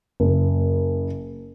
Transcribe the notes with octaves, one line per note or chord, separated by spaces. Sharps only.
F#1